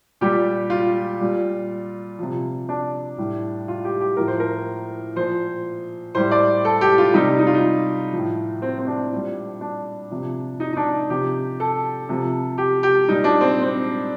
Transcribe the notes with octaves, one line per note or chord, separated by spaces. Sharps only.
A#2 G3 G4
F4
A#2 G3
C3 F3
D4
A2 G3
F4
G4
G4
A2 F3 A#4
C5
A#4
A#2 F3 C5
A2 G3 C5
D5
A4
G4
F4
C3 G3 D#4
D#4
F4
D#4
A2 F3
C4
C4
D4
A#2 G3
D4
C3 F3
D#4
D#4
D4
C3 F3 G4
A4
C3 F3
G4
G4
A#2 G3 D#4
D4
C4
C4